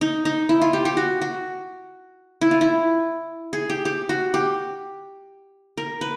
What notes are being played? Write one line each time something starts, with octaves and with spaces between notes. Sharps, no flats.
D#4
D#4
E4
F4
G4
G4
F#4
F#4
E4
F4
E4
G#4
G4
G4
F#4
G4
A#4
B4